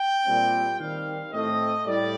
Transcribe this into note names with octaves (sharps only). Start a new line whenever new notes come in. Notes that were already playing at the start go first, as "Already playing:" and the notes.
Already playing: G5
A#2 G3 C4
D#3 G3 C4 F5
A2 A3 C4 D#5
A2 G3 D5